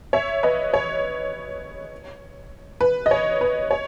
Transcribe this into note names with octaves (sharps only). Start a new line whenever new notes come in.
C#5 E5
B4 D#5
C#5
B4
D#5
C#5
B4
C#5